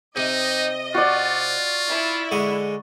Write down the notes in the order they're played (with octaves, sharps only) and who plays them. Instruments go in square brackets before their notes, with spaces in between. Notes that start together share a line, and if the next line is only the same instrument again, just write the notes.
[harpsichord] C3 [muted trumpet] D#4 [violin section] D#5
[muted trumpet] F4 [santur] F#4 D5
[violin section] E4
[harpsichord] D3 G#3 C#6